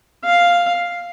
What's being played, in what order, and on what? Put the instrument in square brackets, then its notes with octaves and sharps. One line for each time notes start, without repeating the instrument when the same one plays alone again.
[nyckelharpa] F5